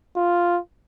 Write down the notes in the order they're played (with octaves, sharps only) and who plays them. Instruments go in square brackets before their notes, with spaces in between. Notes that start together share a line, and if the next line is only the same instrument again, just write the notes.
[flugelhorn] F4